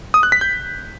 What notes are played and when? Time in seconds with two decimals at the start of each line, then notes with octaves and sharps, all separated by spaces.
0.14 D#6
0.23 F#6
0.32 B6
0.41 G6